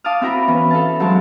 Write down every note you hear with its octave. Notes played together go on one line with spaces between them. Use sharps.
F5 A5 D6 D#6 F6
C4 E4 F#4 A#4 A#5 B5
E3 B3 C#4
A4 F5 A5
G#2 F#3 G#3 A#4 C#5 A5